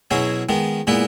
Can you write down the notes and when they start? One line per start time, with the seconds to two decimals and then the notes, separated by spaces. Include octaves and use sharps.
0.11 B2 F#3 C#4 E4 G#4
0.49 D#3 G#3 B3
0.87 A#2 G#3 B3 E4 B4